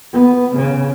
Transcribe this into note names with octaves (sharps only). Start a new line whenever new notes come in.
B3
C#3